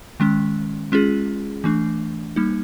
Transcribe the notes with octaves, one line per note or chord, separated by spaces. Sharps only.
D#3 G#3 C#4
G#3 C#4 F4 G#4
E3 A3 D4
G3 A#3 D#4